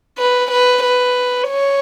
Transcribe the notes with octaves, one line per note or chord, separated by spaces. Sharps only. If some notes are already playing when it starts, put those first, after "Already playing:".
B4
B4
B4
C#5